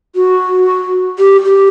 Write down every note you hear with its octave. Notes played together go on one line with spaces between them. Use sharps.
F#4
G4
G4